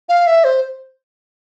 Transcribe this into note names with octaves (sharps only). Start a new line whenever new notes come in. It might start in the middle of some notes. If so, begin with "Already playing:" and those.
F5
E5
C5